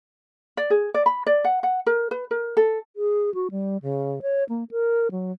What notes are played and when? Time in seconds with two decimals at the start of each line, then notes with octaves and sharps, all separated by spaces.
0.57 D5
0.70 G#4
0.94 D5
1.06 B5
1.27 D5
1.44 F#5
1.63 F#5
1.86 A#4
2.11 B4
2.31 A#4
2.57 A4
2.96 G#4
3.34 F#4
3.51 G3
3.82 C#3
4.22 C#5
4.49 A#3
4.71 A#4
5.11 F#3